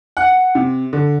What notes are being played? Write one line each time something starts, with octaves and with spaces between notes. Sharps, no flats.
F#5
C3
D3